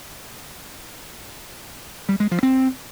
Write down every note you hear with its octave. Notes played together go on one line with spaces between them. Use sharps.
G3
G#3
F3
C4